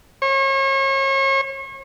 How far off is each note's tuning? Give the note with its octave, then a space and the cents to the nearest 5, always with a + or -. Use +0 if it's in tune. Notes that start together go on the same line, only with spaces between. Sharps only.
C#5 -35